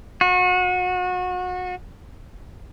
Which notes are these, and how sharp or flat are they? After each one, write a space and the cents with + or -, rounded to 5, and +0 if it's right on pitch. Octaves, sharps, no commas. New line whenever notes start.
F#4 -30